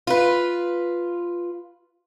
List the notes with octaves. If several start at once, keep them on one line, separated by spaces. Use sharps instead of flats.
F4 B4